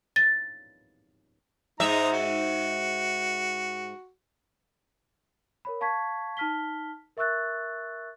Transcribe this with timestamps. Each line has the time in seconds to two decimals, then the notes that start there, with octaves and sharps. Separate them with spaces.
0.16 A6
1.80 G#2 G#3 D#4 E5 A#5
2.12 F#4
5.65 A#4 C#5 B5
5.81 F5 A5 C#6 G#6 B6
6.37 D#4 A5 F6 B6 G7
7.17 A#4 E5 C#6 E6 F#6 A6